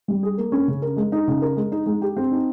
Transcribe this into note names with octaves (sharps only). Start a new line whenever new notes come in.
G3
G#4
A#3
C#4
C#3
A#4
G#3
D#4
C#3
A#4
G#3
D#4
G#3
G4
C4
D#4